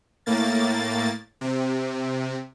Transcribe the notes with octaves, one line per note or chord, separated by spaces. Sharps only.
A2 A#3 A6
C3